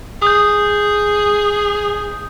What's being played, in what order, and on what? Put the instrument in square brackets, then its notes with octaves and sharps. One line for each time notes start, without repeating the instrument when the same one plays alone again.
[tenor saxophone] G#4 [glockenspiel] D#6 G6